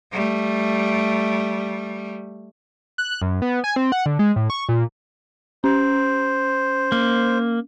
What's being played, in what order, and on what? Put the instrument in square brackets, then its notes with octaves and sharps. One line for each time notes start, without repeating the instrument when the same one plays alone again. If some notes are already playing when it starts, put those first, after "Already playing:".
[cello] G3 A3
[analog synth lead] F#6
F#2
B3
G#5
C4
F#5
D3
G#3
A2
C#6
A#2
[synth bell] C#4 [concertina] C5
[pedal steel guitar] A#3